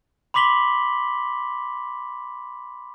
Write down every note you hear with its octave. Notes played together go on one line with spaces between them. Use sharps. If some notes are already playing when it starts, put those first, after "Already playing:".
B5 C6 D6 B6 F#7 G7